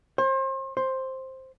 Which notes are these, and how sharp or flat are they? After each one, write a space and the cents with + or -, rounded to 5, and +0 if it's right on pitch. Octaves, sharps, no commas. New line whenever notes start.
C5 +35
C5 +10